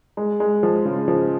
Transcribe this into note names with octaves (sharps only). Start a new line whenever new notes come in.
G#3
G#3
F3
C#3
F3